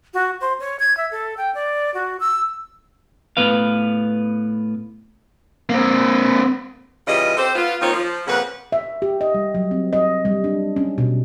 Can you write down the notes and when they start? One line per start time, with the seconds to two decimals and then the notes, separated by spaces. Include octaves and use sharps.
0.14 F#4
0.41 C5
0.60 C#5
0.80 G#6
0.97 E5
1.11 A4
1.37 G5
1.55 D5
1.94 F#4
2.20 E6
3.37 A2 B3 B4 F5
5.69 A#3 C4
7.07 C#3 E3 G3 F4 D#5
7.37 C4 G4 A4 C5
7.55 B3 F4
7.81 D#3 A#3 C4 D#4 F4 C#5
7.93 F3
8.27 F2 A#2 C#3 B4 F#5
8.72 E5
9.02 G4
9.21 D#5
9.34 G3
9.55 F#3
9.71 C4
9.93 D#5
10.25 G3
10.44 D4
10.76 C#4
10.98 B2